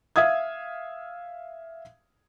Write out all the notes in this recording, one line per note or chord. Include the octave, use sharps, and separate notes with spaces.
E5 F5 D#6 G#6